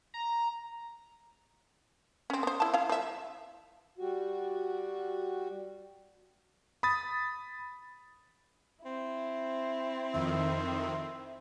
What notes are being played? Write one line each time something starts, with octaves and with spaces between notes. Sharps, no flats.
A#5
C4 C#4
B3 C5
E4 A5
E4 F5
F3 E5
G3 F#4
B5 D#6 A6
C4 E4
F2 D#3 E5